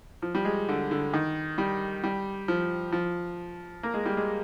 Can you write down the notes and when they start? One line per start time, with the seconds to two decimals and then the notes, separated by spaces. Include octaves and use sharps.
0.22 F3
0.35 G3
0.45 G#3
0.69 D3
0.91 D3
1.14 D#3
1.58 G3
2.03 G3
2.48 F3
2.92 F3
3.83 A#3
3.94 G#3
4.06 G3
4.17 G#3